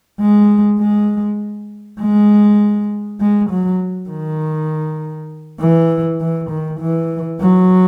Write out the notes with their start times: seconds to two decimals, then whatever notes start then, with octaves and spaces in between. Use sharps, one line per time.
0.20 G#3
0.79 G#3
2.00 G#3
3.21 G#3
3.50 F#3
4.10 D#3
5.60 E3
6.20 E3
6.50 D#3
6.80 E3
7.40 F#3